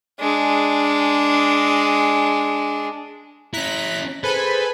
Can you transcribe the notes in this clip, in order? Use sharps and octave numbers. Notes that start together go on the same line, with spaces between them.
G#3 D4
C#4 E4 A#5 F#6 B6
G#4 A4 B4 C5 G#5 B5